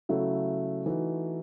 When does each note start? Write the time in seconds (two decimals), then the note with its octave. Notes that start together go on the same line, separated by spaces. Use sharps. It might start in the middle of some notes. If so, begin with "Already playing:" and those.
0.09 C#3 F#3 A3 E4
0.86 E3 A3 D#4 F#4